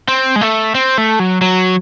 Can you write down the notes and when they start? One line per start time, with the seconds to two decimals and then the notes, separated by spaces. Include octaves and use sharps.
0.08 C4
0.36 G#3
0.41 A3
0.75 C4
0.98 A3
1.20 F#3
1.41 F#3